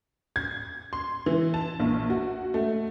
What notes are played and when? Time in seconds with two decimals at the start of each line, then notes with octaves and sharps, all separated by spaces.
0.36 G#6
0.93 C6
1.26 E3
1.54 A5
1.80 A#1
2.10 F#4
2.54 A3